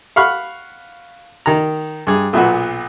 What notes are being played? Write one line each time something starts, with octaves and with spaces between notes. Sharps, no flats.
F5 F#5 B5 C#6 F6
D#3 A#5
G2 G#4
B1 A#2 B3 F#4